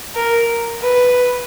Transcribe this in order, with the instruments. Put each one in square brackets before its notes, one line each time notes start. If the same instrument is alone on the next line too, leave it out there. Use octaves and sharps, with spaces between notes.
[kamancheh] A#4
B4